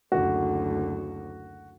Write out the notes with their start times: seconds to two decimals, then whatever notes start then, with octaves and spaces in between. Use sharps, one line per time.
0.12 F#1 D2 F#4